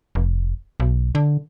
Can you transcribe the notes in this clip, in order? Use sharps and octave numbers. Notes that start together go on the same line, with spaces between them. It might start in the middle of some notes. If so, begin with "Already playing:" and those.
F1
B1
D3